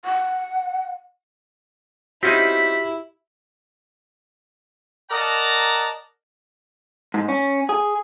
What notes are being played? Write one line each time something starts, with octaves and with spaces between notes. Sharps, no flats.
F#5
C4 C#4 D#4 E4 F#4 G4 B6
A#4 D5 D#5 F#5 A5 A#5
G#2
C#4
G#4